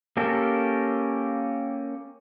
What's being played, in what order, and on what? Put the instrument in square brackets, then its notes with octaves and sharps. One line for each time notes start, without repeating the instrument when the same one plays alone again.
[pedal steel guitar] A#3 C#4 G4 A4 A#4